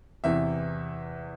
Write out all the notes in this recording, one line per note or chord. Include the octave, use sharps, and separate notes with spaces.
E2 C3 E3 E5